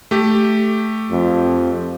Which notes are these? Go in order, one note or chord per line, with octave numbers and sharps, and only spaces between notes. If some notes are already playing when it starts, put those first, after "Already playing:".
A3 G4
F2